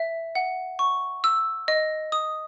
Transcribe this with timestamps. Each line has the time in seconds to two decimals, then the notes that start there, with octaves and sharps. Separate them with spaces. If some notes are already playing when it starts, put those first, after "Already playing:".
Already playing: E5
0.35 F#5
0.79 C#6
1.24 E6
1.68 D#5
2.12 D#6